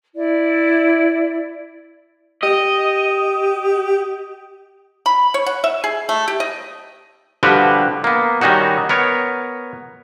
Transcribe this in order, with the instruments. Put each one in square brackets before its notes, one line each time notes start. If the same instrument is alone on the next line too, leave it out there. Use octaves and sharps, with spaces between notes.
[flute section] E4 D5
[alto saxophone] G4 [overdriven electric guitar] D#5
[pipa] B5
C#5
F#5
E5
G#4
A3
G4
D#5
[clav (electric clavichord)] D3 F3 G3 F#4 G4 B4
A#3 B3
D#3 G3 C#4 D#4 F#4
B3 A#4 C#5